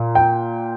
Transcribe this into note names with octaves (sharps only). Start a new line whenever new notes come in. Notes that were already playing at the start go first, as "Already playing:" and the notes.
Already playing: A#2
G5